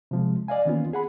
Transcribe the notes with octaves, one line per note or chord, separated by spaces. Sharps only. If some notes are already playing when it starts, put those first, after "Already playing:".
C3 F3 G#3
D5 D#5 F5 G#5
D#3 E3 A#3 B3 C#4 F4
G#4 F#5 B5